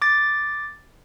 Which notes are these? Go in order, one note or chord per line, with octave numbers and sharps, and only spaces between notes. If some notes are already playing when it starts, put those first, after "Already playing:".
D6 A6